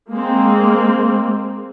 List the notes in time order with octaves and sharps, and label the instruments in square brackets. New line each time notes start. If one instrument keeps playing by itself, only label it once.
[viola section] G#3 A#3 C4